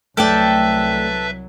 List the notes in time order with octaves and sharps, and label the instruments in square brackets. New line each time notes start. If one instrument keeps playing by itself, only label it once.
[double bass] C2 F#3 [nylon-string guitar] A3 D5 [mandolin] A4 G5 [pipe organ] B4 E5